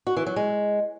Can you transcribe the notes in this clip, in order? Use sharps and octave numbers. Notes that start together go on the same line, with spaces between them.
F#4
E3
F#3
G#3